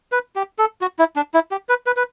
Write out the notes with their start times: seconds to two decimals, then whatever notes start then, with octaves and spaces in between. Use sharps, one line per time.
0.12 B4
0.36 G4
0.59 A4
0.81 F#4
0.99 E4
1.16 D4
1.34 E4
1.51 G4
1.69 B4
1.86 B4
1.97 B4